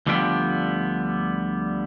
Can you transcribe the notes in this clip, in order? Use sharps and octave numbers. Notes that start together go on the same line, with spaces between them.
D2 D3 F3 G3 B3 G5